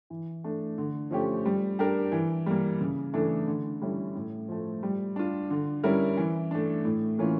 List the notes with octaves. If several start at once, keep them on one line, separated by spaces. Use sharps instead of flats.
E3
A3 D4
D3
F3 A3 C#4 G4
G3
D4 G4 A#4
E3
G3 A#3
C#3
E3 A3 D4 A4
D3
G3 C#4 E4 A4
A2
F3 A3
G3
D4 F4
D3
G3 C#4 E4 A#4
E3
A3 D4
A2
E3 A#3 C#4 F4